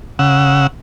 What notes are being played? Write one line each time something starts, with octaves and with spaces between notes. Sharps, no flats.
C#3 F#5 E6